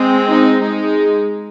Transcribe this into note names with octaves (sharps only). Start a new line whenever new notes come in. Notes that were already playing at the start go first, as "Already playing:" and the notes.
Already playing: G#3 C4
D#4
G#3 D#4